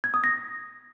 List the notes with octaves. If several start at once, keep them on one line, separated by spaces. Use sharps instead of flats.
G#6
D#6
A#6